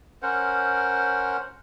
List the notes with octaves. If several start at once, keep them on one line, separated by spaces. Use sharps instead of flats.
C#4 A#4 C5 F#5